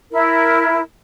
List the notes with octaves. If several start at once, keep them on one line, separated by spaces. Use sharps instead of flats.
E4 A#4